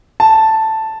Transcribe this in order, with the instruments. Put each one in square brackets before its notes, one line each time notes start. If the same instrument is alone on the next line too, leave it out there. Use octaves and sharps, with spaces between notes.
[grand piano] A5